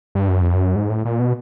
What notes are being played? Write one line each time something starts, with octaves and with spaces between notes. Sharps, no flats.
G2
F#2
F2
F#2
G#2
A2
A#2
B2